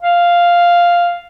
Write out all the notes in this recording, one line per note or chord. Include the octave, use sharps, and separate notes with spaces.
F5